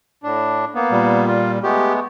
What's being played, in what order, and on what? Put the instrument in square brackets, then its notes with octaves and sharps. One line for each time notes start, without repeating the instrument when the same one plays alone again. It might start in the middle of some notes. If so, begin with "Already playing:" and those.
[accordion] A2 D4
A#3 B3
[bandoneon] A#2 G3
[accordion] F4
[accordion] G#3 A3 B3 [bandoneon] G4